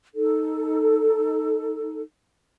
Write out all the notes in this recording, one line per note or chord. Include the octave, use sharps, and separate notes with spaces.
D#4 A4